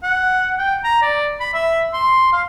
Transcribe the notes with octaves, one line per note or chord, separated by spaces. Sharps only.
F#5
G5
A#5
D5
B5
E5
C6
F5